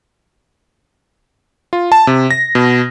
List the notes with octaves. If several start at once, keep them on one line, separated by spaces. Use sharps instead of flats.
F4
A5
C3
A#6
B2